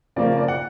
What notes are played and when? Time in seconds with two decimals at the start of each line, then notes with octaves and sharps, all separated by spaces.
0.16 C#3 F3 A#3 D5
0.38 D5
0.48 F#5